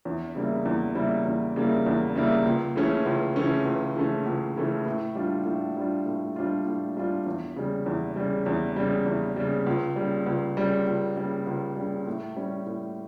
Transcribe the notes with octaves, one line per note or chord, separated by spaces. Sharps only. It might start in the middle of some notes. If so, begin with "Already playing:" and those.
E2
C#3 G3 A#3 E4
E2
C#3 G3 A#3 E4
E2
C#3 G3 A#3 E4
E2
C#3 G3 A#3 E4
C#2
C#3 E3 A3 C#4
C#2
C#3 E3 A3 C#4
C#2
C#3 E3 A3 C#4
C#2
C#3 E3 A3 C#4
A2
G3 D4 F4
A2
G3 D4 F4
A2
G3 D4 F4
A2
G3 D4 F4
E2
C#3 G3
E2
C#3 G3
E2
C#3 G3
E2
C#3 G3
C#2
C#3 G3
C#2
C#3 G3
C#2
C#3 G3
C#2
C#3 G3
A2
G3 C#4
A2